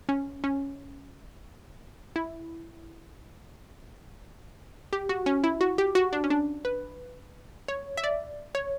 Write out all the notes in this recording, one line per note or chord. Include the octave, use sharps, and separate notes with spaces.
C#4
C#4
E4
G4
F#4
C#4
E4
F#4
G4
F#4
D4
C#4
D4
B4
C#5
E5
D5
C#5